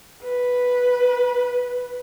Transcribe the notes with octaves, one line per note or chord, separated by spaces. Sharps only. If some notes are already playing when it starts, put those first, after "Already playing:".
B4